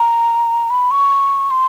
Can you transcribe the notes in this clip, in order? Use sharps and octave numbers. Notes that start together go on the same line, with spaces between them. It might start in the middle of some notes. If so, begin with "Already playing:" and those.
Already playing: A#5
B5
C#6
C6